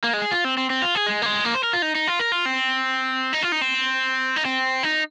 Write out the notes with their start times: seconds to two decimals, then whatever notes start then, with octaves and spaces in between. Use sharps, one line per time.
0.04 A#3
0.13 G#3
0.22 G#4
0.32 F4
0.44 C4
0.58 C4
0.70 C4
0.82 F4
0.95 G#4
1.06 G#3
1.22 A#3
1.26 G#3
1.45 A#3
1.55 C5
1.63 A#4
1.73 F4
1.82 D#4
1.95 D#4
2.07 F4
2.19 A#4
2.32 F4
2.45 C4
3.33 D#4
3.42 F4
3.52 D#4
3.61 C4
4.36 D#4
4.45 C4
4.83 D#4